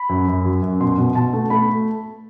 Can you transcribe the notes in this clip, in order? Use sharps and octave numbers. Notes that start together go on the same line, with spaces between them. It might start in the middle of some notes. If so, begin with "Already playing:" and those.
Already playing: B5
F#2
F#2
F#3
F#2
B2 C6
B2
B2 A5
A3
A3 B5